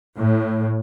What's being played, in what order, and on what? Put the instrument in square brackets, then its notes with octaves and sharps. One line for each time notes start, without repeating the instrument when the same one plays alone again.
[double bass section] A2